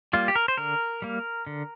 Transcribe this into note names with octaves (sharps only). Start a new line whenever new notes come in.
G3 A#3 F4
G4
A#4
C5
D3 A#4
G3 A#3
D3